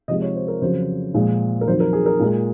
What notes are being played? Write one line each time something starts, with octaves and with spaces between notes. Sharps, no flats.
C3 F3 G#3 D#5
C#5
C5
A#4
F2 C#3 F#3 C5
A#2 F3 G#3
A#4
F2 D#3 F#3 C5
A#4
G#4
A#4
A#2 G#3